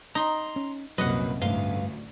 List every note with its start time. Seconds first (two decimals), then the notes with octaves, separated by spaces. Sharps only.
0.15 D#4 A#5 C6
0.56 C#4
0.98 C2 F#2 A#2 F#3 A#3 B4 D#5 F#5
1.42 A1 D2 G2 B4 F5 C6